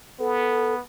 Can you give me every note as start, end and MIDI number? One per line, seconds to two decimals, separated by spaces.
0.19 0.80 59
0.19 0.74 69